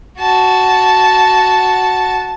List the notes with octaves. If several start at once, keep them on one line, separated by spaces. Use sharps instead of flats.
F#4 A5